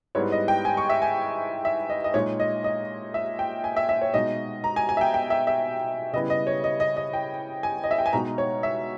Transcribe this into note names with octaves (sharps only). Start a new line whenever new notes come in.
G#2 G3 B3 E4 C#5
D#5
G5
G#5
C#6
E5
G#5
E5
D#5
D#5
A#2 G#3 D#4 C#5
D#5
D#5
E5
G5
G#5
E5
E5
C#5
B2 G#3 D#4 D#5
A#5
G#5
G#5
E5
G5
G5
E5
E5
C#3 G3 B3 E4 D#5
D#5
C#5
D#5
D#5
D#5
G5
G#5
D#5
E5
G5
G#5
B2 G#3 D#4 A#5
C#5
E5